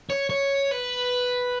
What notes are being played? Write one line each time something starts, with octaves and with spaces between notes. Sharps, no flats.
C#5
C#5
B4